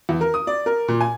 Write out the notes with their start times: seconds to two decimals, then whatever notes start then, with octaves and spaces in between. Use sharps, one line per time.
0.09 E2
0.21 A#4
0.34 D#6
0.47 D5
0.66 A#4
0.88 A#2
1.01 G#5